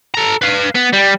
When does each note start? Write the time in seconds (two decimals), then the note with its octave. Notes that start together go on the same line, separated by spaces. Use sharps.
0.15 A4 A#5
0.42 B4 F5
0.75 B3
0.93 G3